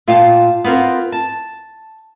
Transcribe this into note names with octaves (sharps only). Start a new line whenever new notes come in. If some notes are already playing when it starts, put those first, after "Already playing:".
A#2 F4 F5 G5 A5
B3 C4 F4 A#4 C5
A5